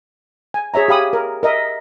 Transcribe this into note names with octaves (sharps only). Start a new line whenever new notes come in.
G#5
G#4 C#5 E5 A#5
G4 F5 B5 D#6
A#4
A#4 D#5 E5